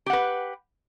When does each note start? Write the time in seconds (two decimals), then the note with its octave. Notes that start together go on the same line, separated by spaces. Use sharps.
0.06 G4
0.10 F#5
0.13 B4